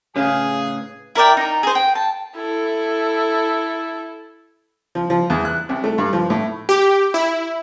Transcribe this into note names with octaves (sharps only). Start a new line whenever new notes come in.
A2 C#3 G#4 B4 F5 G#5
E4 A#4 D5 G5
D#4 A#4
G#4 C5
G5
A5
E4 A4
F3
F3
E2
F#6
C2
A3
G2
F3
A2
G4
E4